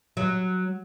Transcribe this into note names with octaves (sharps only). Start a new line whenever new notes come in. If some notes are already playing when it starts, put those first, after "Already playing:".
F#3